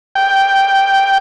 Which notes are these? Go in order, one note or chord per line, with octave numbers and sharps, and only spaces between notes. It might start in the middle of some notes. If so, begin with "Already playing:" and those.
G5